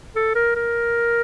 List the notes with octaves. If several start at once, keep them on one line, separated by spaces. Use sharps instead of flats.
A4
A#4
A#4